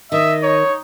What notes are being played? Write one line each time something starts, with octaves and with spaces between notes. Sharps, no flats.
D#3 D#5 E5
D#4 C#5